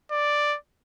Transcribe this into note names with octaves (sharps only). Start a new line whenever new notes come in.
D5